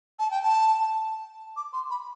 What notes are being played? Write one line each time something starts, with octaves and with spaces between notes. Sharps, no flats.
A5
G5
A5
D6
C6
B5